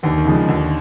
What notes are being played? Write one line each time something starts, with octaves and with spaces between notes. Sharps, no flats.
D#2 D3 E3
D#3
C#3 F3 G#3
D3
D#2 D3